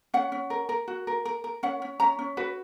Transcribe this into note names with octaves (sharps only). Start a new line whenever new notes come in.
C#4 F#5
C#4
A#4
A#4
F#4
A#4
A#4
A#4
C#4 F#5
C#4
C#4 A#5
C#4
F#4 B4